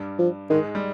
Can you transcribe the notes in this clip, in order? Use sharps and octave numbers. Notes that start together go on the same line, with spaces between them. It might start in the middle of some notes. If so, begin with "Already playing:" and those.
Already playing: G2 G3
F3
G#2 D#3 G#3
G3